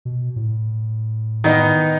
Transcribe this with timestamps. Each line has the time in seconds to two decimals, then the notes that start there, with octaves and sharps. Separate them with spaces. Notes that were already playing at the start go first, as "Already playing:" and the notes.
0.05 B2
0.36 A2
1.44 D#3 B3 D#4